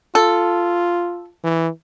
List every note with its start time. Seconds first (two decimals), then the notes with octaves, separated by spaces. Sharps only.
0.15 F4 A4
1.44 E3